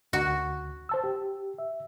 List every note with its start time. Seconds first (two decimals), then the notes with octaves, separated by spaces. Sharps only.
0.13 D2 F#4
0.89 C5 A5 E6
1.04 G4
1.58 E5